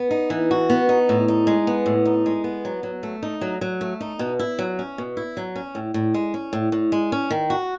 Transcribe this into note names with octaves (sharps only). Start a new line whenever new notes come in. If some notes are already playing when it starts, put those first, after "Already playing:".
Already playing: B3
D#4
E3
F#4
B3
D#4
A2
D#4
G#3
B3
A2
D#4
G#3
B3
F#3
F#3
A3
D#4
F#3
F#3
A3
D#4
B2
E4
F#3
C#4
B2
E4
F#3
C#4
A2
A2
G#3
C#4
A2
A2
G#3
C#4
D#3
F#4